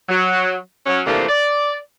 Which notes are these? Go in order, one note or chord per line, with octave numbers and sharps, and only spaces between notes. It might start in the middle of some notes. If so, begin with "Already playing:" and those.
F#3
F#3 C#4
C3 E3 F3 A3 A#3 D4
D5